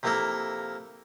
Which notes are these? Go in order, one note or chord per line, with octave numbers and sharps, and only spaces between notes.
C3 F3 A#3 E4 A4 A#4